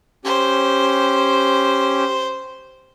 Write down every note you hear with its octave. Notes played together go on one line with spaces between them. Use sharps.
C#4 G4 C5